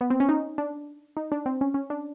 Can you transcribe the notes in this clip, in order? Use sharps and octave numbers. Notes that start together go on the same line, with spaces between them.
B3
C4
C#4
D#4
D4
D#4
D4
C4
C#4
C#4
D4